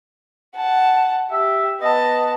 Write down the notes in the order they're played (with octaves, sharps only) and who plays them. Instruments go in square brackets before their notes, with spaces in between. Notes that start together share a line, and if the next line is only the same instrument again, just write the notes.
[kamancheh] F#5 A5
[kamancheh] G4 [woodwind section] E5
[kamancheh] B3 A5 [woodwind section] D#5